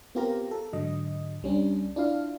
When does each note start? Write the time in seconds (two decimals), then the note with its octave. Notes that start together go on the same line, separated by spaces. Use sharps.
0.15 B3 C4 F4 G4 A#4 A#5
0.51 A4
0.73 G#2 D3 F#3 D#5
1.42 C#2 G3 C#4 D4
1.96 D4 E4 F4 F5